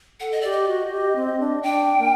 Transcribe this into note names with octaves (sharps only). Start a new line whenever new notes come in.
A4 F#5
D#5
G4 D5
D#5
F#4
F#4
G4
C4
D4
D4 G5
A#3